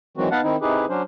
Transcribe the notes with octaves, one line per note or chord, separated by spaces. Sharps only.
D#3 E3 F#3 G#3 C4 F#4
B3 D#4 B4 F5 F#5 A5
D#3 C4 D#4 E4
C3 D#4 E4 G4 G#4 B4
F#3 C#4 D4 C5